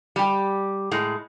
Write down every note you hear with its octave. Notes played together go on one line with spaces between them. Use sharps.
G3 G4
A2 G#3